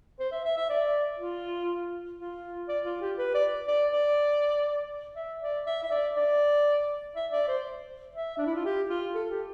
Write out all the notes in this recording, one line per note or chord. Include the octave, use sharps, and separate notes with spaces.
C5
E5
E5
E5
D5
F4
F4
D5
F4
G4
B4
D5
D5
D5
E5
D5
E5
E5
D5
D5
E5
D5
C5
E5
D4
E4
F4
G4
F4
A4
G4